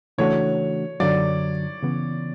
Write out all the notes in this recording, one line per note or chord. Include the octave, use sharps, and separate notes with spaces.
C#3 E3 A3 D4 F#4 C#5
F#2 D3 F#3 D5
C#3 E3 B3